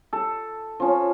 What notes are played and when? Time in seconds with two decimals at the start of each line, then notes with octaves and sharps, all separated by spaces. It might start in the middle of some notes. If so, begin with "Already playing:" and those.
0.13 A4
0.80 F3 C#4